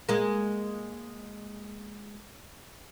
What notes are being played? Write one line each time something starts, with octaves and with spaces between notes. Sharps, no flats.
G#3 A#3